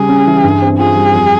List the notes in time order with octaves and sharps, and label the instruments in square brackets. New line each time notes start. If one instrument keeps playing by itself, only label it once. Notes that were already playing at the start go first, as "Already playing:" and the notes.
Already playing: [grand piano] C#3 G3 [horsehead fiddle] G#4
[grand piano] C#4
E3
G2
C4
[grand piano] F4 [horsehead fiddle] G#4
[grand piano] G3
F2